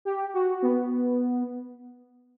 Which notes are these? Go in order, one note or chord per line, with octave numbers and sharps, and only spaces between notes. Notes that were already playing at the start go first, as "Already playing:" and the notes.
G4
F#4
B3